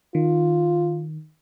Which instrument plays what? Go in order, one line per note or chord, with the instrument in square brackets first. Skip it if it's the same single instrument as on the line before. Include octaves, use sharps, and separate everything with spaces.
[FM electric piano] D#3 [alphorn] F4